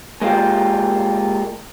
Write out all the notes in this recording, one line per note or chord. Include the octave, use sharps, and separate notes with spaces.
G#3 A#3 F4 G4